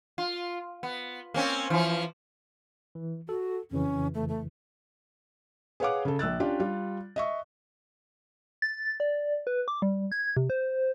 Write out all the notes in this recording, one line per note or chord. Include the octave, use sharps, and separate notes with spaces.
F4
B3
A#3 C4 C#4
E3 F3
E3
F#4 A4
F2 C#3 E3 C#4
A3
A3
G#4 B4 C#5 F5 F#5 D6
C#3 A4
A#1 E6 F#6 A6
C#4 D4 F4 G4 D5
G3 F4
D#5 E5 C#6
A6
D5
B4
D6
G3
G#6
C3
C5